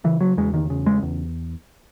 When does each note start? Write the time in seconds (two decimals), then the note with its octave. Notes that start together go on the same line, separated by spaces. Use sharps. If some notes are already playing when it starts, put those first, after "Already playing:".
0.04 C#3 E3
0.21 F#3
0.37 E2 G#3
0.54 D#3
0.70 C#3
0.86 G#3
1.03 E2